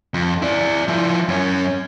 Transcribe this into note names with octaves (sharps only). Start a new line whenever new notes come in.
F2
E4 D5
F3 E4
F#2 C#4